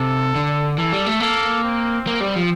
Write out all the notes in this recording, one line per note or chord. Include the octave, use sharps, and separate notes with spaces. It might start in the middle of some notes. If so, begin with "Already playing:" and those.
Already playing: C3 A4
D3
E3 A4
G3
A3
A#3 A4
C4
A#3
G3
F3